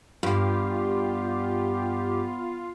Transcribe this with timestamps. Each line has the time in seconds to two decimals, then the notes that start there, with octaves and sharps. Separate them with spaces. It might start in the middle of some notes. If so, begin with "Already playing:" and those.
0.23 G2 B3 F4 G4